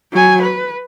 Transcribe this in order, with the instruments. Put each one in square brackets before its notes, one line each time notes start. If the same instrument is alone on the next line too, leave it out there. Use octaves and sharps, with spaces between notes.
[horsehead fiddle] F#3 G#5
B4